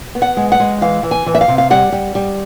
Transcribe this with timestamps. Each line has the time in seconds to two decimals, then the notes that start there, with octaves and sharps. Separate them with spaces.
0.15 B3
0.22 F#5
0.37 G#3
0.52 F#5
0.60 G#3
0.81 E3 F5
1.03 E3
1.11 G#5
1.26 E3
1.35 E5
1.41 F5
1.48 C3
1.58 F5
1.70 G3 F#5
1.92 G3
2.15 G3